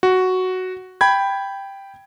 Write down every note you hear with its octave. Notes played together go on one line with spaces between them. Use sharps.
F#4
G5 B5 G#6